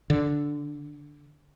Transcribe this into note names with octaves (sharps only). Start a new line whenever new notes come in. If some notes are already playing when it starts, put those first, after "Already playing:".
D3